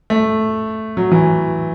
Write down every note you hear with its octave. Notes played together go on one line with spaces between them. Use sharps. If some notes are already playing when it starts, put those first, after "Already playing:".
A3
F#3
E3